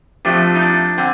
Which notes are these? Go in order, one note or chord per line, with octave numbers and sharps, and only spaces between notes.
C3 F3 A3 D4
D#4
D4
D3 C4